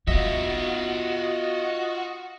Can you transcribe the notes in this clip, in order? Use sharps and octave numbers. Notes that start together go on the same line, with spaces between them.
B3 F4 F#4 D#5 E5